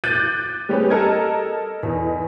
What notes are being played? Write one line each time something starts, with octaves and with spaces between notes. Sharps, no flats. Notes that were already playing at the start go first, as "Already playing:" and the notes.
D6 F#6 G6 A6 D#7
G3 C4 C#4 G4 G#4 B4
A4 A#4 D#5 A5 G#6
E2 D#4